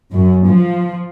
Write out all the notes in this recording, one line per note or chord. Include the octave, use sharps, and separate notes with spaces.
F#2
F3